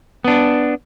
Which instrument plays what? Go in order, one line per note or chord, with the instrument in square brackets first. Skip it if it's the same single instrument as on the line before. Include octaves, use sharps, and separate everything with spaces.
[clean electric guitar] B3 D4